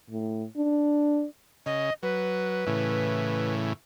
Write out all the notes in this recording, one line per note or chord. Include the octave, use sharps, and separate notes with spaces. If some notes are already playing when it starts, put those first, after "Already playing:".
A2
D4
C#3 D#5
F#3 B4
A2 C#3 E3